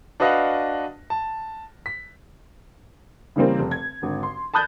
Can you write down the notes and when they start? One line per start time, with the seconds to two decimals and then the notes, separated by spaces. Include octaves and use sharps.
0.20 D4 F#4 B4 D#5 F5 F#5
1.10 A5
1.86 B6
3.36 C#3 E3 G3 A#3 C4
3.59 F1
3.71 G#6
4.02 G#1 D3
4.23 C6
4.54 A5 B5 D#6 F#6 G6 A6